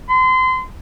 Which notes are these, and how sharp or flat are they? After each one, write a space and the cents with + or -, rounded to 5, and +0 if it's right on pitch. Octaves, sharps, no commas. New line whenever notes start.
C6 -30